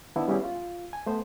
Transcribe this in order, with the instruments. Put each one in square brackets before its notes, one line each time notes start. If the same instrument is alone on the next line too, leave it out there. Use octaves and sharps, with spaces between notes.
[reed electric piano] D#3 B3 D4 E4
G3 B3 C#4 E4 G4 G#4
F4
G#5
A3 B3 C5